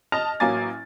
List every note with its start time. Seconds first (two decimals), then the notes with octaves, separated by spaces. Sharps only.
0.12 D#5 A5 F6 A#6 F7
0.40 A1 F#3 A#3 G#5 D6 A6